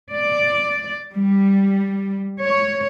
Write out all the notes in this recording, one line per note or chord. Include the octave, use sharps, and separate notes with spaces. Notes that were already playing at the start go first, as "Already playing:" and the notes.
D5
G3
C#5